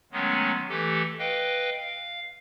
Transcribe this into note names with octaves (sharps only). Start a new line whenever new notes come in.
D#3 F#3 G#3 A3 B3 C#4
E3 A3 G4 A4
B4 D#5 F5 G5
F5